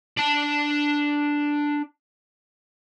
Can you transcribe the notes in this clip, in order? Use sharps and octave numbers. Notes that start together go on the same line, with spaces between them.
D4 A5